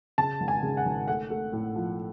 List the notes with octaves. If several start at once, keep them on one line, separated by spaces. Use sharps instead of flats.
C#3 A5
G#1
G#5
C#3
F#5
G#1
A3 F#5
A3
A2
F3